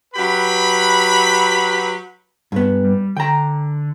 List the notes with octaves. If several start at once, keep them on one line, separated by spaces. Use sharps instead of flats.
F#3 G4 B4 B5
G2 B3
G3
D3 G5 A#5